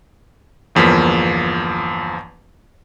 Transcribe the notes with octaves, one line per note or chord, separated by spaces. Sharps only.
G1 E2 F3 A#3 B6